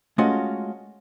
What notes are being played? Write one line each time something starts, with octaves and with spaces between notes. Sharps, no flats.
G#3 A3 C#4 F4 F#4 D#5